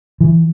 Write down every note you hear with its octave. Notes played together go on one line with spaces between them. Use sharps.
E3